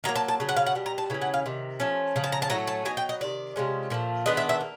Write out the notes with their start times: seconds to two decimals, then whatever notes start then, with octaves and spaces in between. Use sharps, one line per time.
0.04 D#3 F#3 A#3 A#5
0.16 A5
0.28 A5
0.40 C#3 F#3
0.49 F#5
0.56 F5
0.66 F#5
0.75 B2 G3
0.86 A#5
0.98 A5
1.10 C#3 E3 C#4
1.22 F#5
1.34 F5
1.46 C3 D#3
1.80 F3 A3 C#4
2.16 C#3 F3
2.24 A5
2.32 A#5
2.42 A5
2.50 A2 F#3 A3 C#4 A#5
2.67 A5
2.85 F#3 B3 D#4 G#5
2.97 G5
3.09 D#5
3.21 C3 D#3 D5
3.56 C3 F3 G#3 C#4
3.90 A#2 F3 A3
4.26 D#3 G#3 B3 D4 D#5
4.37 E5
4.49 E5
4.61 A#3